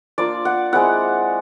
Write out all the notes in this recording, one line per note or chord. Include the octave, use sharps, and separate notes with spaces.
A#3 D4 F4 D5
F#5
G#3 C4 E4 F#5